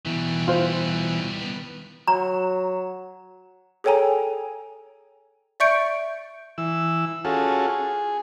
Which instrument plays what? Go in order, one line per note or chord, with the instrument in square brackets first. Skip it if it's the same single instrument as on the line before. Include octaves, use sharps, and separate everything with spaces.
[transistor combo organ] B2 E3 [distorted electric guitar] D#3 G3
[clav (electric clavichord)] F4 C5
[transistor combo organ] B3
[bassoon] F#3 [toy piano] A#5
[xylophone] G#4 A4 C#5 G5 G#5 A#5
D5 E5 C#6 G6 C#7 D7
[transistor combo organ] E3 E6
C#4 F4 F#4 G#4 A4
G#4